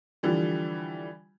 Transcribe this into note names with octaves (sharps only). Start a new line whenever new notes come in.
D3 E3 F3 G3